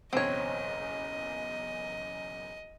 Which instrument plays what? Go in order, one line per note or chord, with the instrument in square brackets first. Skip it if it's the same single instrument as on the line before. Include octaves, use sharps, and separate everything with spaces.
[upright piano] F#1 B1 E2 [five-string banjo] C4 C#5 [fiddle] D#5